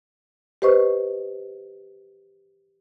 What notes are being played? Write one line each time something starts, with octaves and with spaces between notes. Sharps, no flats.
G4 B4 C5 D#5 C#6